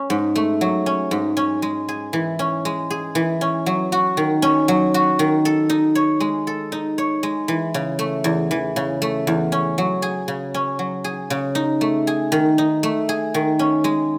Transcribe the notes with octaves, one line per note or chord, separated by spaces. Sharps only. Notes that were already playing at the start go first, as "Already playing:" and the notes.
Already playing: C#4
G#2
A3
F#3
C#4
G#2
C#4
G#3
G#4
E3
C#4
G#3
G#4
E3
C#4
F#3
F#4
D#3
C#4
F#3
F#4
D#3
A4
D#4
C#5
G#3
A4
D#4
C#5
G#3
E3
C#3
A3
E2
E3
C#3
A3
E2
C#4
F#3
G#4
C#3
C#4
F#3
G#4
C#3
D#4
A3
G#4
D#3
D#4
A3
G#4
D#3
C#4
G#3